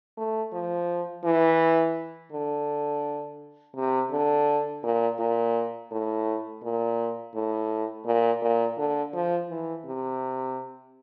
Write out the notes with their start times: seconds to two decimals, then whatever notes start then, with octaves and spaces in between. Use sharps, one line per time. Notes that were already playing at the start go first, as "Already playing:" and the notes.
0.17 A3
0.53 F3
1.24 E3
2.32 D3
3.76 C3
4.12 D3
4.83 A#2
5.19 A#2
5.92 A2
6.63 A#2
7.35 A2
8.06 A#2
8.42 A#2
8.78 D3
9.14 F3
9.50 E3
9.86 C3